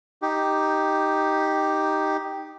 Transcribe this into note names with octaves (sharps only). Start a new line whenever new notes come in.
D#4 G4